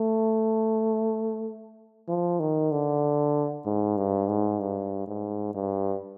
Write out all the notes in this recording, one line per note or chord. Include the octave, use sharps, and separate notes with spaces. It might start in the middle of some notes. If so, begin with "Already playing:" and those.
Already playing: A3
F3
D#3
D3
G#2
G2
G#2
G2
G#2
G2